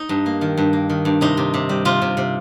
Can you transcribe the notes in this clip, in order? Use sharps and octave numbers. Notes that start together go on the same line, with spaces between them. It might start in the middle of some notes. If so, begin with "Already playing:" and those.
Already playing: D#4
G2
A#3
D#3
G2
A#3
D#3
G2
C3 D#4
C3
C3
G3
C3 F4
C3
C3